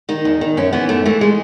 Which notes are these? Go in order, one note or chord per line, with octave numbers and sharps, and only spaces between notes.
D#3 D#4
E2
D#3
F#2 C#4
E3 B3
F#2 A3
E3 A3
G#3